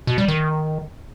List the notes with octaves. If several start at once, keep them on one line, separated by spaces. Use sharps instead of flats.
B2
G3
D#3